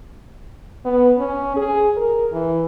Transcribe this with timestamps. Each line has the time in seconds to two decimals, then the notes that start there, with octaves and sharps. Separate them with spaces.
0.85 B3
1.18 C#4
1.56 G#4
1.97 A#4
2.32 E3